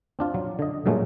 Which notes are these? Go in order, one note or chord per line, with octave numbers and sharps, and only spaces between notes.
C4 D4 F4
F#3
D3 D#5
G2 A#2 F#3 G#3 A3